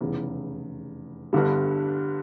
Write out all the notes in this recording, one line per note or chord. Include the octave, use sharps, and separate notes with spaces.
F1 E2 C#3
G1 G2 D3 G3